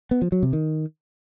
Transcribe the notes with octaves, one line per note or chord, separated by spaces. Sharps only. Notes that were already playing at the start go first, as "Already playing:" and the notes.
B3
F3
F#3
C3
D#3